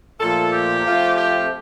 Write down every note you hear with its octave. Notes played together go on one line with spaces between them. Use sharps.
A#2 F3 A3 A4
G4
F3 A3 C4 F4
G4